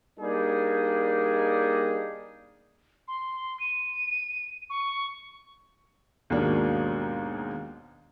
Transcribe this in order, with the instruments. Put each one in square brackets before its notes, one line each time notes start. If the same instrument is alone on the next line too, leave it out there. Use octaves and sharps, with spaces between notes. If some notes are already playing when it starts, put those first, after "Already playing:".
[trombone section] G3 A#3 D4 D#4 G#4
[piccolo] C6
D#7
C#6
[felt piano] D#2 G#2 B2 A#3 D4